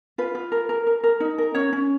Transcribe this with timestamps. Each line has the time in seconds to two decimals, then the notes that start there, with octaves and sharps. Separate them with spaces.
0.18 F4 B4
0.35 F4
0.52 A#4
0.69 A#4
0.87 A#4
1.04 A#4
1.20 D#4
1.38 A#4
1.55 C#4 C#5
1.73 C#4